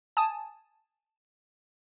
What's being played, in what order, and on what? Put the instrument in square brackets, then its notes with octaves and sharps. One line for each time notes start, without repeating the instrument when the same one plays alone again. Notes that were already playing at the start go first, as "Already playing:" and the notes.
[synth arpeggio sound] G#5 A5 D#6